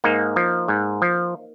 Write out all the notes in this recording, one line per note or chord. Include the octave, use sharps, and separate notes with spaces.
G#2 A#3 D#4
F3
G#2
F3